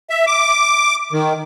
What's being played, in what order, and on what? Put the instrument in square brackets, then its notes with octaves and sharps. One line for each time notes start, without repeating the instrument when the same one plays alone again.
[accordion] E5
D6
D#3